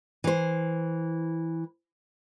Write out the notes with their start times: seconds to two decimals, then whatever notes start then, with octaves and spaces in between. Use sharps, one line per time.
0.24 E3 C5